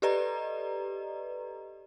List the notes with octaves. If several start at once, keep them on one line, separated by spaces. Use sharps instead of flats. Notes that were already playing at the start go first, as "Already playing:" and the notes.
G4 A4 B4 D5 D#5 A#5